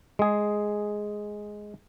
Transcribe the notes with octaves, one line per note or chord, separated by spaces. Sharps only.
G#3 G#4